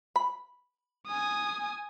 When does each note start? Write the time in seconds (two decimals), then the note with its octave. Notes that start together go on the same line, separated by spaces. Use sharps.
0.16 B5
1.08 G#5 D#6